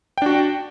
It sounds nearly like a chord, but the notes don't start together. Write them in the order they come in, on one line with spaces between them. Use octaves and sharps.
G5 D4 F#4